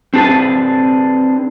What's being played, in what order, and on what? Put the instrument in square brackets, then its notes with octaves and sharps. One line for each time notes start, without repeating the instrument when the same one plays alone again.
[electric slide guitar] C4 D4 G#4 B4 A5